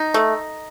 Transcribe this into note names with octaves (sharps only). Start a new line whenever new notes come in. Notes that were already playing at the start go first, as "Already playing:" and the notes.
Already playing: D#4
A3